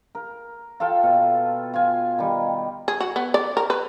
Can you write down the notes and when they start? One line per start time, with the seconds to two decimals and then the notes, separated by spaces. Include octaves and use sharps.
0.15 A#4
0.80 F4 A4 F5 G5
1.03 B2
1.74 F4 G#5
2.18 D#3 G3
2.88 G#4
3.00 F#4
3.16 B3
3.34 D5
3.57 A#4
3.70 B4